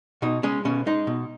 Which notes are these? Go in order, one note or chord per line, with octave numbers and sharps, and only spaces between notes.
B2 D#4
G#3 C#4
B2 C#4
G#3 D#4
B2